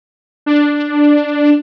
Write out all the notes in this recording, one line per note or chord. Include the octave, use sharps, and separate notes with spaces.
D4